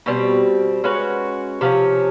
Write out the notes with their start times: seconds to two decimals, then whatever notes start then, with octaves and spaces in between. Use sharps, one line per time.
0.06 B2 G3 C4
0.84 G#3 C#4 F#4 B4
1.61 C3 F3 A3 C#4